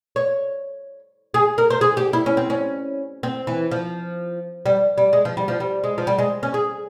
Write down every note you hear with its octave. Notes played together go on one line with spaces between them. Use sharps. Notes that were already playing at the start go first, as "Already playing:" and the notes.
C#5
G#4
A#4
C5
G#4
G4
E4
C#4
C4
C#4
C4
E3
F3
G3
G3
G#3
F3
G3
F3
G3
G#3
F3
G3
G#3
C#4
G#4